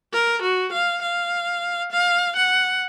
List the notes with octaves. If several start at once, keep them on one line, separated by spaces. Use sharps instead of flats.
A#4
F#4
F5
F5
F5
F#5